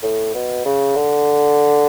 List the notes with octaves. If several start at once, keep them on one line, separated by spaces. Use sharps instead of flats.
A2
B2
C#3
D3